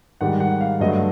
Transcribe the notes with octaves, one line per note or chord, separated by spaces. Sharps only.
G#2 D#3 G3 F#5
F#5
F5
G2 D3 F#3 A3 D#5